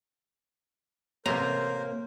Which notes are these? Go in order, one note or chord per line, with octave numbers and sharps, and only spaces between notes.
A1 C3 A#3 A#4 C5 C#5 A#5